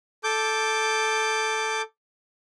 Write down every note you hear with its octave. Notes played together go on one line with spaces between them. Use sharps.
A4 D6 G6